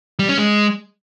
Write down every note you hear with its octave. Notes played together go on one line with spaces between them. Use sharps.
G3
C#4
G#3